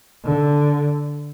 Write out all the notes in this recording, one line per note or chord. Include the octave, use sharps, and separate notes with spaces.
D3